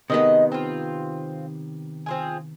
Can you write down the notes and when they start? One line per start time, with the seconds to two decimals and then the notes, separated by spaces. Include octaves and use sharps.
0.10 C3 D#3 G#3 B3 D#5
0.52 C4 F4
2.06 C4 F4 G#4